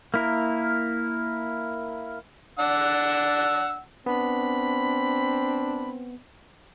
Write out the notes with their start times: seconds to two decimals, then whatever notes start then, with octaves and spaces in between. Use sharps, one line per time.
0.14 A#3 E4 A#4
2.59 D4 F#5 E6
4.06 B3 C4 D4 B5